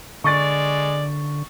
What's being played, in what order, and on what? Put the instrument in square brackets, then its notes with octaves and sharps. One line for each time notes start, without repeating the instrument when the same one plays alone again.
[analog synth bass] D3 [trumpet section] G#3 D5 [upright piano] C#6 A6